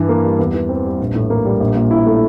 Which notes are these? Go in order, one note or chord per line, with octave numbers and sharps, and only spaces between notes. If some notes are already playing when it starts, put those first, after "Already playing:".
Already playing: G2 E3
A#3
G3
E2
E3
C4
G3
A#1
A2
A#3
G3
A#1
A#2
E4
A3